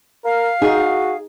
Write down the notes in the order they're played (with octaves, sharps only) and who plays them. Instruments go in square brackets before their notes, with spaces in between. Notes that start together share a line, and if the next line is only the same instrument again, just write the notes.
[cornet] A#4 [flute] F5
[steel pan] D#4 [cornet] F#4 [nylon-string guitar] G#4